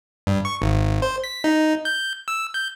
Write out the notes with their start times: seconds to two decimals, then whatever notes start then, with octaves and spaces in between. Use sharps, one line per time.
0.27 G2
0.45 C#6
0.62 G#1
1.02 C5
1.24 B6
1.44 D#4
1.85 G6
2.28 E6
2.54 G6